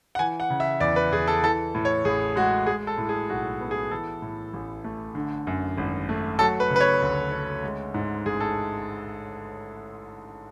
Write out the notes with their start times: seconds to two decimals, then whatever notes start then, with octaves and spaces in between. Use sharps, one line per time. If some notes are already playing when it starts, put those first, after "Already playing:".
0.15 F#5
0.19 E3 G#5
0.40 F#5
0.50 C#3
0.60 E5
0.80 E2 D5
0.96 B4
1.12 E2 G#4
1.28 A4
1.43 E3 A4
1.74 A2
1.85 C#5
2.05 A1 G#4
2.36 G#3 F#4
2.67 G#3 G#4
2.87 A4
2.98 A2
3.09 G#4
3.29 B1 F#4
3.61 B3
3.71 G#4
3.91 E3 A4
4.22 A2
4.54 A1
4.84 A3
5.15 D3
5.47 F#2
5.78 G#1
6.09 A3
6.39 F#3 A4
6.60 B4
6.70 C#3
6.76 B4
6.80 C#5
7.02 D2
7.32 C#4
7.64 G#3
7.94 G#2
8.26 A1 G#4
8.40 A4